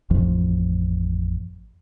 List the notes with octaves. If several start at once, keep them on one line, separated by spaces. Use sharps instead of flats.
A1 F2 F3